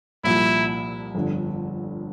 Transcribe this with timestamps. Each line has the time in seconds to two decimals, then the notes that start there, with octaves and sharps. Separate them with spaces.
0.24 C2 A#2 F3 A#3 E4
1.14 G1 F2 D3